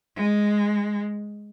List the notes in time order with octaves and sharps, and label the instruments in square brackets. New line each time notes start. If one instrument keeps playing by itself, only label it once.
[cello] G#3